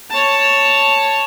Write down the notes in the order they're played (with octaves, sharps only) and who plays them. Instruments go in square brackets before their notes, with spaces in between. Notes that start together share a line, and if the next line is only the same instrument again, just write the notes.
[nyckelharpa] C#5 A5